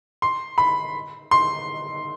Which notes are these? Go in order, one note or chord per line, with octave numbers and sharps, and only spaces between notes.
C6
B5
C6